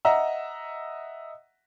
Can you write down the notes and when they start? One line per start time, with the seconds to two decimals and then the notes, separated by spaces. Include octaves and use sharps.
0.05 D#5 E5 F#5 A#5 E6